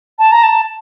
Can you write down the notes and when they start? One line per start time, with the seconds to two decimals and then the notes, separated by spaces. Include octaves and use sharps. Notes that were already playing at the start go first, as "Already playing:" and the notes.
0.19 A5
0.32 A#5
0.43 A5